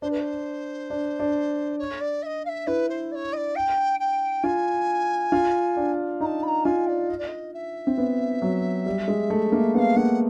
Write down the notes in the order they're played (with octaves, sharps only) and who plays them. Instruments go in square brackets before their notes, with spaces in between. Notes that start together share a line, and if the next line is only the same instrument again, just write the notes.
[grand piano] D4 [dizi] C5
[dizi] B4
C5
[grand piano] D4
D4
[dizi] C#5
D5
E5
D#5
F5
E5
[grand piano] E4 [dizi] B4
[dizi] C5
D5
C#5
D#5
D5
G5
G5
[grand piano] F4 [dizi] G#5
[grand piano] F4
D4
[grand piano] D#4 [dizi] A#5
[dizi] A5
B5
A#5
[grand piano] F4 [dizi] G#5
[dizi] D5
D#5
D5
D#5
E5
[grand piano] C4
B3
F#3
G3
G#3
A3
A#3
[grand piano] B3 [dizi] F#5
[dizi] F5
[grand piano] A#3 [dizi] F#5